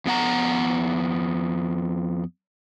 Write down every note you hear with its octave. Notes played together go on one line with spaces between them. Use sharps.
F2 B3 F#5 A#5